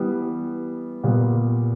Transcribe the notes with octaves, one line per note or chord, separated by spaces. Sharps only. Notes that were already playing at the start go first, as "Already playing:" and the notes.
Already playing: E3 G3 B3
A#2 G3 B3